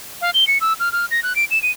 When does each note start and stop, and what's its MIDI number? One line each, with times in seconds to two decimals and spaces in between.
0.21 0.30 77
0.34 0.47 103
0.47 0.58 97
0.61 0.73 88
0.80 0.92 89
0.92 1.06 89
1.11 1.20 94
1.23 1.36 90
1.36 1.45 98
1.51 1.61 100
1.62 1.71 99